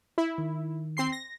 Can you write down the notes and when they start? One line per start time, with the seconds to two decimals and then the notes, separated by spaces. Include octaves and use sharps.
0.18 E4
0.38 D#3
0.97 C4 C6 C7
1.12 A#6